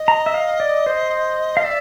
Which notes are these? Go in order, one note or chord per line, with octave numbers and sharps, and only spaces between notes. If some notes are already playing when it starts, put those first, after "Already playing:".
Already playing: D#5
A#5
E5
F5
D5
C5
F5
D5 E5